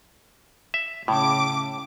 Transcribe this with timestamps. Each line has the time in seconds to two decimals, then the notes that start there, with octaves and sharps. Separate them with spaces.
0.74 E5
1.08 A2 C#3 D6